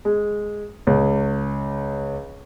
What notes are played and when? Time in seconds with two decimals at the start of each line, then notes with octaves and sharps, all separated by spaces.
0.05 G#3
0.87 C#2